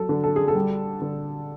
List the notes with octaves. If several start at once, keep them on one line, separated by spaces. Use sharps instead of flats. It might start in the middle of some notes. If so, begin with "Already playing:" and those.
Already playing: F#3 A4
D3
A4
G#4
A4
G3
D3